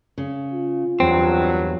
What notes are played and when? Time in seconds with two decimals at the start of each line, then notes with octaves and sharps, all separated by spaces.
0.18 C#3
0.53 F4
1.00 E2 G2 F#3 C4